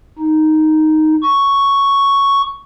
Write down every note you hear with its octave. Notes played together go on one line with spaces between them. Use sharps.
D#4
C#6